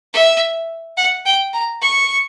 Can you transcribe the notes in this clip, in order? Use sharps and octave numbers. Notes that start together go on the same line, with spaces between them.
E5
F#5
G5
A#5
C#6